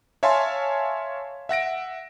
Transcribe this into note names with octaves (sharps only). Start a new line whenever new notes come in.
C#5 E5 F5 G#5 A5 C6
E5 F#5 A#6 D7